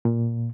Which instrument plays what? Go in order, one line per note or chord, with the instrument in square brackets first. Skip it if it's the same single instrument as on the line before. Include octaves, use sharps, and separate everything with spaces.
[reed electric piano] A#2